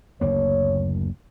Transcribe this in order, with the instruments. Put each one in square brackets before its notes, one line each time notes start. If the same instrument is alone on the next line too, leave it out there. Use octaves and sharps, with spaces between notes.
[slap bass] F#1 D2 A#3 [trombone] C#5